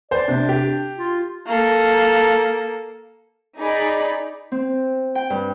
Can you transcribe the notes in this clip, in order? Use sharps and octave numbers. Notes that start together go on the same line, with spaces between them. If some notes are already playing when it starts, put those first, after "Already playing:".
C5 D5
C3 D4
G4
F4
A#3 A4
D#4 G#4 D5 B5
C4
G5
G2